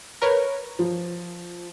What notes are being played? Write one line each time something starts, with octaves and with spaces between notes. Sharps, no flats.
A#4 B4 C#5
F3